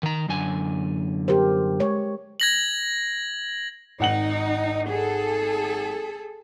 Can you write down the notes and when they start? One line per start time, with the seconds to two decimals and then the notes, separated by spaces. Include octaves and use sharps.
0.03 D#3 A#5
0.28 F#2 D3 G#5
1.28 G4 A#4 C5
1.80 G#3 C#5
2.40 G#6 A#6 F#7
4.00 G#1 D#4 F#5 F#7
4.91 G#4 A4